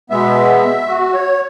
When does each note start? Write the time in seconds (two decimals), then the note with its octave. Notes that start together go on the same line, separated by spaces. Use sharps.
0.10 B2 G#3 B3 E5
0.88 F#4
1.13 C#5